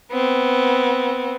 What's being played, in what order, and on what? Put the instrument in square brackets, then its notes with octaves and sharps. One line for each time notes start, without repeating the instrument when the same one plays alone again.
[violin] B3 C4